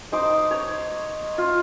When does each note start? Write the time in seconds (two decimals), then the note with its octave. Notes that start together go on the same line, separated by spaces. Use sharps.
0.12 D#4 C5 D6
0.51 C#5
1.38 F4